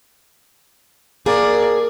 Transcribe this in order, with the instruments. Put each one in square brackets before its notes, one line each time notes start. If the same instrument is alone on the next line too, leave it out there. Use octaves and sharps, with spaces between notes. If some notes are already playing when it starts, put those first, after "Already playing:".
[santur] A#3 A#4 [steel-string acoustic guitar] G#4 [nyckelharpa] D5